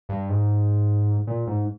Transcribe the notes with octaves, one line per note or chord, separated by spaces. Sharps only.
G2
G#2
A#2
G#2